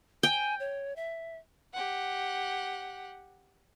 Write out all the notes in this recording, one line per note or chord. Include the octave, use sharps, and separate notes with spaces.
G5 G#5
C#5
E5
G4 F#5